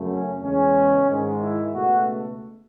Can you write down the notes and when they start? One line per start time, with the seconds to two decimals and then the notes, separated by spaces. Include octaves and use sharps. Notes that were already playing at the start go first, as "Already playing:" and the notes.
Already playing: F#2 C#3 F#3 A3
0.10 C#4
0.42 E2 C#3 G#3 C#4
1.08 G#2 D#3 G#3
1.41 E4
1.74 C#2 B2 A3 F#4